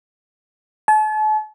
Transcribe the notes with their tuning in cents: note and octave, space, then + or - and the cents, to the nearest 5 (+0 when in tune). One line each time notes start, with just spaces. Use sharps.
A5 -40